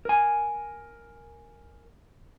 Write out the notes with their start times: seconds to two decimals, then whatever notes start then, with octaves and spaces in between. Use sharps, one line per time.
0.05 A#4 G#5